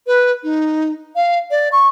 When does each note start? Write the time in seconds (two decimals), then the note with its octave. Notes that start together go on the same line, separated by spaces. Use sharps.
0.07 B4
0.44 D#4
1.16 F5
1.51 D5
1.72 C#6